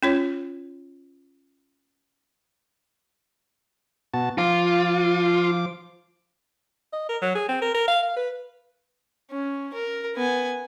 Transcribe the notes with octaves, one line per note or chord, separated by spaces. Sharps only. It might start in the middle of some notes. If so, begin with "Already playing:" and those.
C#4 F4 C#5
B2 F#4 A5
F3 F4 D6
D#5
A#4
F#3
G#4
C4
A#4
A#4
F5
F5
B4
C#4
A#4
B3 G#5